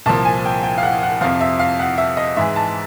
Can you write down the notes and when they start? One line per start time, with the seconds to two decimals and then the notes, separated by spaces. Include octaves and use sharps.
0.06 C2 A#2 F3 A5
0.25 G#5
0.45 G5
0.63 G5
0.78 F5
0.83 F#5
1.03 F#5
1.21 F2 C3 F3 F5
1.41 E5
1.59 F5
1.80 F#5
1.98 E5
2.17 D#5
2.37 G#2 E3 G#3 E5
2.56 A5